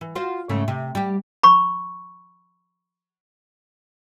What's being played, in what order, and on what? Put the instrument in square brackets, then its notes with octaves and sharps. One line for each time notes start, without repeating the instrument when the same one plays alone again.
[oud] E3
F4 F#4 C5
G#2 C#3 A3
C3
G3 G4
[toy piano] B5 C#6